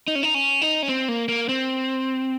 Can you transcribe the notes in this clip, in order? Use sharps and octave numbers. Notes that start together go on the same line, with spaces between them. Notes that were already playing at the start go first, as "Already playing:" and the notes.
D#4
C#4
D#4
C#4
D#4
C#4
C4
A#3
A#3
C4